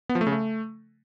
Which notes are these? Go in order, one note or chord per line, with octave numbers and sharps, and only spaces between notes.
B3
F3
A3
C#3
A3